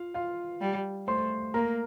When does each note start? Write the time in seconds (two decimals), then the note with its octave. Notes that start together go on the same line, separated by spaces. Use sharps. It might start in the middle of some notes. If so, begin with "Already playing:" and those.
Already playing: F4 F5
0.14 F4 F5
0.61 G3
1.07 A3 C5 C6
1.54 A#3 A#4 A#5